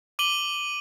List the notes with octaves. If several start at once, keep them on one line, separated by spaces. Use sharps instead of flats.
D6 D#7 F#7 G7